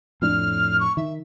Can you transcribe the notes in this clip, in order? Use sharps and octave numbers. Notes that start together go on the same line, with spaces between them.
F2 A2 D4 F6
C#6
D#3 E5